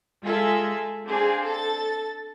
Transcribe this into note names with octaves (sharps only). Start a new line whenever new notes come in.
G#3 F4 G#4 A4 E5
C4 D4 G#4 F5
A4 A6